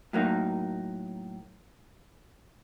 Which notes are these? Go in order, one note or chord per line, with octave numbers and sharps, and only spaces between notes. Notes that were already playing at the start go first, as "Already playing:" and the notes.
A2 F#3 A#3 D#4